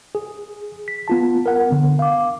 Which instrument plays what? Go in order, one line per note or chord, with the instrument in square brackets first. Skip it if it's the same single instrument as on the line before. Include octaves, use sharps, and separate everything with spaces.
[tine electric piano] G#4
B6
B3 F4 A5
A#4 F#5
D3 B3
F5 D6